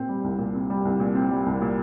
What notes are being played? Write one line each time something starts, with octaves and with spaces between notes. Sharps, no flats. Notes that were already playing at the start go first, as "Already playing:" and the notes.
Already playing: A#2 C4
G3
C2
A#2
C4
G3
C2
A#2
C4
G3
C2
A#2